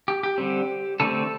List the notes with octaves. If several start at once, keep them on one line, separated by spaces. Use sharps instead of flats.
G4
G4
D3 G3 C4
D3 A3 C4 A4